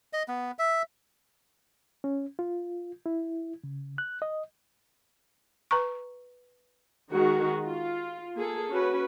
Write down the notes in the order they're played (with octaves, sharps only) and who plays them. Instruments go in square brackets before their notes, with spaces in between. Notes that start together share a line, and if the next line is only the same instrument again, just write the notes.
[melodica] D#5
B3
E5
[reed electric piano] C#4
F4
E4
C#3
F#6
D#5
[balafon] B4 A#5 C#6
[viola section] D#3 G#3 F#4
F4
A#3 G#4 A4
C#4 F#4 B4